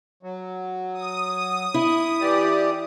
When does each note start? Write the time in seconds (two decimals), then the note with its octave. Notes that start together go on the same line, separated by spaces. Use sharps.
0.23 F#3
0.94 D#6
1.74 E4
2.21 E3 G4 D5